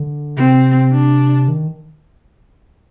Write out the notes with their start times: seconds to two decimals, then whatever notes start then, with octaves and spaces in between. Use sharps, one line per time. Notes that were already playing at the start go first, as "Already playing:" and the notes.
Already playing: D3
0.37 C3 C4
0.92 D4
1.48 D#3